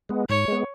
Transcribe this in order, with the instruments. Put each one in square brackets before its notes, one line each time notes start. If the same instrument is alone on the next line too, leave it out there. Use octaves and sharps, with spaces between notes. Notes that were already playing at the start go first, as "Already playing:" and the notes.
[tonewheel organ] G#3 B3
[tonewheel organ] G#2 [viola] C#5
[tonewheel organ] G#3 B3